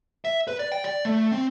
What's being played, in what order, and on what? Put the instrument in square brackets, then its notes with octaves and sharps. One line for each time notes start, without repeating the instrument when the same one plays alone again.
[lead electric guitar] E5
B4
D5
G5
D5
A3
C4